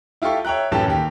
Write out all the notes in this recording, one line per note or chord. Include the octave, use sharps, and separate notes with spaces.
E4 F4 G4 A4 C#6
C#5 E5 G5 A#5 F#6
F#2 A2 E3 C#4 G4 A5
D#2 G4